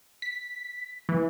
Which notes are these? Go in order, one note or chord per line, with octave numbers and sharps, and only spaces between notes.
B6
E3